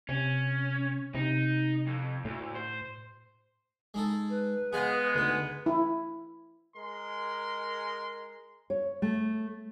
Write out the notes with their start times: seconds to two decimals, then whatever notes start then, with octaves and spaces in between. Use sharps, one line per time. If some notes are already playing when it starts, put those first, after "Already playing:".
0.09 C3 C#4
1.15 C3 D#4
1.87 F2
2.25 D2 A2
2.55 C5
3.94 G#3 D#4 A4
4.29 B4
4.73 G#3 B3 G#4 D#5 F5
5.15 D2 D#4
5.66 E4
6.75 G#3 A#4 C6
8.70 C#5
9.02 A3